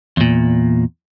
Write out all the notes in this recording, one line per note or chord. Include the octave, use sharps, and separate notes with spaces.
E2 A#2